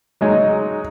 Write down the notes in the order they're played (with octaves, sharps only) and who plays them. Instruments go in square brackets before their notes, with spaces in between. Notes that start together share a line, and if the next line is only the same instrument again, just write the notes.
[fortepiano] F#3 G#3 D#4